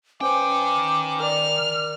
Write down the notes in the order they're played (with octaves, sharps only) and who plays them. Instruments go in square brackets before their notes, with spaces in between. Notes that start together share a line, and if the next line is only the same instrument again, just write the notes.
[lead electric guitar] D#3 G5 [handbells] C#4 B4 C5 [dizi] D6
[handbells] A#4 D5 [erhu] F6